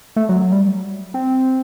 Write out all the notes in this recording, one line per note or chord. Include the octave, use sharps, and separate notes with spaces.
A3
F#3
F#3
G3
C4